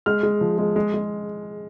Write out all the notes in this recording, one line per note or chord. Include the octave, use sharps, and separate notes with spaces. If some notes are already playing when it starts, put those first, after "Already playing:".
G#3 F6
G#3
F3
G#3
G#3
G#3